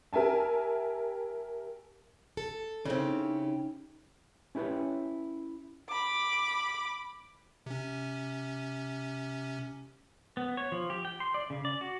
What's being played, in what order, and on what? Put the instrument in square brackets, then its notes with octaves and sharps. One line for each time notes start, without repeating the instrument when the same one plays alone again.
[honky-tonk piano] G4 A#4 E5 G#5 A5
[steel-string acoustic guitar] A4
[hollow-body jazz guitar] C#3 C4 [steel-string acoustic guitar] C#4 E4 G4 [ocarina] D#4
[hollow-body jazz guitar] C#4 E4 G4 B4 C#5
[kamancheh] B5 D6
[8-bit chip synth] C3 C#4
[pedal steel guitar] B3
C#5
F3
G4
G5
C6
D5
C#3
D5
F#4